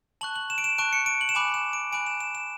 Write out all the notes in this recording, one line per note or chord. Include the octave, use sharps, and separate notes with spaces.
A5 C#6 F#6 F#7
F#7
E7
D7
E7
A5 C#6 F#6 D7
C#7
D7
F#7
E7
G#5 B5 D6 F#6 F#7
E7
D7
G#5 B5 D6 F#6 D7
E7
E7
E7